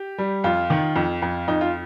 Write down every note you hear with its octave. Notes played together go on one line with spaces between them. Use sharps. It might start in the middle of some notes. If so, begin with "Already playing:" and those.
Already playing: G4
G3
F2 F4
D#3
F2
F2
F2 D#4
F4